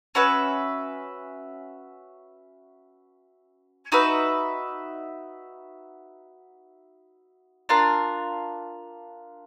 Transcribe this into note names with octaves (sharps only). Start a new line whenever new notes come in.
C#4 F#4 B4 E5
D#4 F#4 B4 E5
D4 F4 A#4